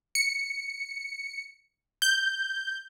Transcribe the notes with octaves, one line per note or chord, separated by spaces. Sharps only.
C#7
G6